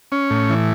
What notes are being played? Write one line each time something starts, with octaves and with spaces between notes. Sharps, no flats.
C#4
A2
E3